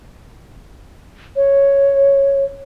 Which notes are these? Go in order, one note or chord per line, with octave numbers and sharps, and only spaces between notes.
C#5